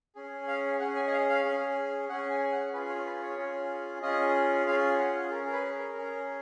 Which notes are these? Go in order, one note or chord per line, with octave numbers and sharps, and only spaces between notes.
C#4 G#4
F5
C#4 G#4 F#5
G#5
D#5
F5
F5
C#4 G#4
C#4 G#4 F#5
G#5
F#5
C#4 F4 G#4 B4
C#5
B4
C#5
C#4 F4 G#4
C#4 F4 G#4 D#5
C#4 F4 G#4 F5
F#5
C#4 G#4 A#4
A#4
B4
A#4
C#4 G#4